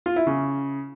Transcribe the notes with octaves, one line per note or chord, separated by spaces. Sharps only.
F4
E4
C#3